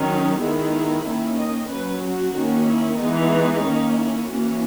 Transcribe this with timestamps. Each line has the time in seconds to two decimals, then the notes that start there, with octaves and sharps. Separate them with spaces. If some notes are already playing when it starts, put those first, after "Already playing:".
Already playing: D#3 F#3 C#4
0.09 D#4
0.41 D#3 G#3 B3 E4
1.05 D#3 A#3 C#4
1.38 D#5
1.69 F#3 C#4 B4
2.02 F#4
2.35 D#3 A#3 C#4
2.66 E4
2.99 E3 G#3 B3 D#4
3.63 D#3 A#3 C#4
3.95 E4
4.27 E3 A#3 C#4 F#4